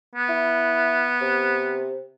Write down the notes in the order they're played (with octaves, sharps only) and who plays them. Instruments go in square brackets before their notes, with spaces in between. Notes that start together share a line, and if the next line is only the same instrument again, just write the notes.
[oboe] B3
[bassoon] E4
C3